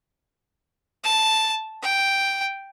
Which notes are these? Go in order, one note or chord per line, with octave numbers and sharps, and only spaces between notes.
A5
G5